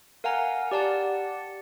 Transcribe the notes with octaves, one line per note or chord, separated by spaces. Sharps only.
A#4 F5 F#5 G#5 A#5
G4 D5 F#5 A5